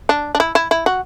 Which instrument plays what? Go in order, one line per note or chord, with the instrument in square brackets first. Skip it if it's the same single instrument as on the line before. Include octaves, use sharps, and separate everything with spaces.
[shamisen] D4
D4
E4
E4
E4
F#4